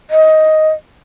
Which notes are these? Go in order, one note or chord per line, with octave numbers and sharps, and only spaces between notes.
D#5